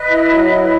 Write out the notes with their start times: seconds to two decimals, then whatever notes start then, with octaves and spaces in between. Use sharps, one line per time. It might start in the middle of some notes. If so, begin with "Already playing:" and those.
Already playing: B4 D#5
0.10 E4
0.31 F#3
0.49 E4